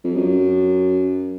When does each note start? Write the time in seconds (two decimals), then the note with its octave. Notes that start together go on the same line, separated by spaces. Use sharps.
0.04 F2
0.16 F#2